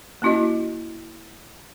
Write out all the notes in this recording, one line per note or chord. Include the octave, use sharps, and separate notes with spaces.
A#3 C#4 E4 F#4 D#5